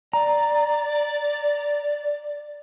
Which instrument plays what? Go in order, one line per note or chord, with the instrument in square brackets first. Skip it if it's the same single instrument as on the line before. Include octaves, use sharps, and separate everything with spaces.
[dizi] D5 [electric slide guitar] A#5